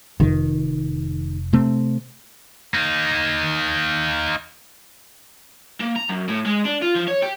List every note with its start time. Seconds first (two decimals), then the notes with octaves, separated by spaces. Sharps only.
0.20 F1 D#3
1.53 C3 A3 C4
2.74 A#3 D#4
5.80 A#3
5.96 A#5
6.09 F#2
6.28 A2
6.46 G#3
6.65 D4
6.82 F4
6.95 F3
7.08 C#5
7.23 G4